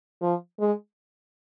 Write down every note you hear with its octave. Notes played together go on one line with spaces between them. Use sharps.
F3
G#3